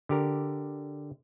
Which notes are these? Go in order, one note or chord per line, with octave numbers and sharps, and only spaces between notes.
D3 G4 A#4